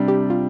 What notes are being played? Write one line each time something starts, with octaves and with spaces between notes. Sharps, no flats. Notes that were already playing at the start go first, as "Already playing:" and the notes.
Already playing: C3 G3 D4
G4
F4